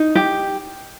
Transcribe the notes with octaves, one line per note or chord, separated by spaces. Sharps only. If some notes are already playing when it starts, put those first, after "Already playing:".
Already playing: D#4
G4